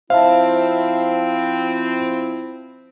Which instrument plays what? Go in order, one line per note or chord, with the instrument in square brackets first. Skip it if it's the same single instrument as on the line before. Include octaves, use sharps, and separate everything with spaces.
[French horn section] F3 C4 [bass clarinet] E4 [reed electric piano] C5 E5 A5 [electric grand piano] F5